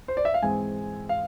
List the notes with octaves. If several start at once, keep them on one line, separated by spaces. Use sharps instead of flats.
C5
D5
E5
F5
G#2 E3 G#3 C4 G#5
F5